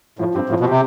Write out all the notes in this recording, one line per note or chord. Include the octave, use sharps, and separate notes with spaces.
A2 F3
G2 C4 G4
A2 F3
B2
C3 C4 G4